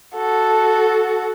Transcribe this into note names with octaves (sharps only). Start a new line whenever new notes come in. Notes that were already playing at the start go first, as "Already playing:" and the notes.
F#4 A4